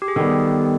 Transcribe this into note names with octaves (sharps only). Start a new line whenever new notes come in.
G4
G#4
D#3 G3 B3 G4 A4